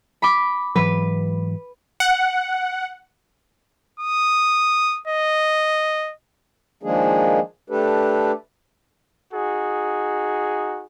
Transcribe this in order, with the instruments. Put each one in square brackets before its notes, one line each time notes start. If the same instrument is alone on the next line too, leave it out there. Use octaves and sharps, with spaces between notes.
[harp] B5 D6
[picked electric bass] G#2 E3 F#3 [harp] B4
[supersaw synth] F#5
[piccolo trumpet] D#6
D#5
[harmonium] D#3 F3 G#3 A#3 D4 G#4
A3 D4 G4 A4 B4
[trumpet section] D#4 F#4 G#4